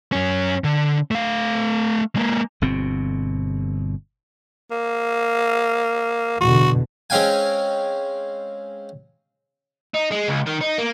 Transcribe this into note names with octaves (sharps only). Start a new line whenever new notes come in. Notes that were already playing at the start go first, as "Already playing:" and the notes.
F#2 C#4
D3
A3 F5
G#3 A#3
G1 B2 C4
A#3
E2 B2 D3 F#4
G#3 C4 C#4 F5 G5 G#5
D#4
G#3
C#2
D#3
D#4
A#3